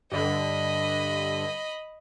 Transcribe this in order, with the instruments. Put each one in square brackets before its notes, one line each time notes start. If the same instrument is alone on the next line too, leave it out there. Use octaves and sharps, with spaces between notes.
[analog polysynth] G2 D3 [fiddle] D#5 B5